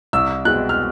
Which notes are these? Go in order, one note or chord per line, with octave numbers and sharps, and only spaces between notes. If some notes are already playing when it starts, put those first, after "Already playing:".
C2 E6
B2 G#3 C4 F#6
F6